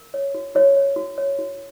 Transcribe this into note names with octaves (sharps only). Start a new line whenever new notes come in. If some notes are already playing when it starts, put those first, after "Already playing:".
Already playing: A#4
C#5
F#4
F#4 C#5
C#5
F#4
C#5
F#4